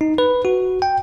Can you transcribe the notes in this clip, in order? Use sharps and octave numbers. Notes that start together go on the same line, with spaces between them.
D#4
B4
F#4
G5